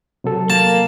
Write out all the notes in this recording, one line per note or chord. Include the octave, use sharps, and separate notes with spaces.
C3 F#3 A4
A#3 A5